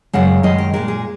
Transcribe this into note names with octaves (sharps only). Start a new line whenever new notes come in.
F#2 C#3 G#3 F#5
F#2 D#3 G#3 D#5
A#4
A#2 G#3 A#4
G#4